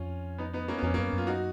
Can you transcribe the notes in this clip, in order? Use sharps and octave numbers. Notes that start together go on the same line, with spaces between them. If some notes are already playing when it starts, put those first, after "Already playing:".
Already playing: F2 C#4 F4
B3 D#4
B3 D#4
A#3 C#4
B3
F2 A#3 C#4
A#3 C#4
F#2
F#2 F4
D#4 F#4